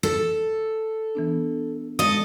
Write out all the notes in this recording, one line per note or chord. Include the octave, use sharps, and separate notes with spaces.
A4
E3 B3 D4
G#3 A4 D#5